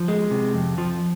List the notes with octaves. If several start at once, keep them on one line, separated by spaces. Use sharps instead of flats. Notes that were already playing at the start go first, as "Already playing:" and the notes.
Already playing: F3
G#3
C3
F2
F3